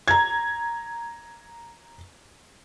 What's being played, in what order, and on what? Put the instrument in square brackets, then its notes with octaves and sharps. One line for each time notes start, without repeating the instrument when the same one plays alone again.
[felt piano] A#5 G#6